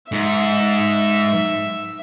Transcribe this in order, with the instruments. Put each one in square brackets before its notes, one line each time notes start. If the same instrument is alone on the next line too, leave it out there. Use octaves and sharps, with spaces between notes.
[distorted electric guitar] G#2 [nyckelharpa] E5